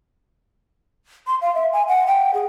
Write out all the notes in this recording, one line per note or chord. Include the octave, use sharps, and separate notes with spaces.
C6
F5
E5
G#5
F#5
G5
G#4